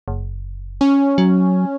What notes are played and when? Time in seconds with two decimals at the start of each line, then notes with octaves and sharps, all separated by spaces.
0.08 F#1
0.81 C#4
1.18 F#3